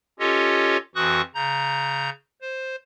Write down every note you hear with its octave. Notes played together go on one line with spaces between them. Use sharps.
C#4 F4 G4 A4 C#5 D#5
F2 E3 F#4 C#6 D#6 F#6
C#3 A#5 G6
C5